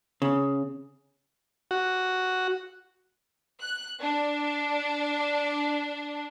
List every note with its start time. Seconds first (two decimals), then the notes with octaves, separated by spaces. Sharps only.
0.22 C#3
1.71 F#4
3.61 F#6
4.00 D4